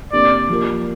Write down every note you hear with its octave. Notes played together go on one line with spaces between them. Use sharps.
C3 A#3 D4 G4 D5
F3 A#3 G4 A#4